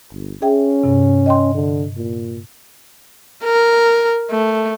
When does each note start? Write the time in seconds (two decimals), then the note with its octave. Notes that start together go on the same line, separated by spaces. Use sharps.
0.12 G1
0.42 C#4 G#4 E5 G5
0.84 G2 C3
1.26 D#5 G5 C6
1.55 D3
1.97 A#2
3.44 A#4
4.31 A3